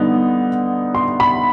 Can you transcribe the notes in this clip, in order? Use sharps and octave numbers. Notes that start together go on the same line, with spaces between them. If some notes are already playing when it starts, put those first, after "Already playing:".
Already playing: D3 G3 B3 D#4
C6
B5